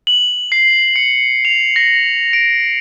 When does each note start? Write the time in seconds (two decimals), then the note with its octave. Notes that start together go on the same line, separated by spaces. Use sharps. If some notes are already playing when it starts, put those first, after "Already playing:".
0.07 F#7
0.52 C7
0.96 C#7
1.45 F7
1.76 A#6
2.33 D7